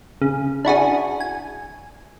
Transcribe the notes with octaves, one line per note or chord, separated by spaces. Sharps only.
C#3
D4 E4 F#4 G#4
G#5